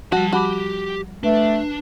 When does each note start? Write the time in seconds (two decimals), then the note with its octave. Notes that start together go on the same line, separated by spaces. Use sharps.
0.12 F3 G3 F#4 G4 A5
0.33 F#4 G4 A5 B5 D6
1.23 A3 D4 B4